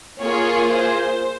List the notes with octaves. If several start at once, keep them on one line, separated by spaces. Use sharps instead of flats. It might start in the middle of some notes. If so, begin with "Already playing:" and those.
A#3 F4 G#4 C#5
C5